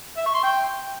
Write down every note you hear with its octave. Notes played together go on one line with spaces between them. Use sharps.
E5
C#6
C6
G5